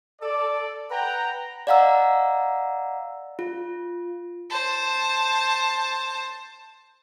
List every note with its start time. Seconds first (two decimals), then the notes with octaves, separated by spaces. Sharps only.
0.22 A4 D5
0.91 B4 F#5 G5 A#5
1.67 D5 D#5 F5 F#5 A#5 E6
3.39 F4
4.50 C5 A5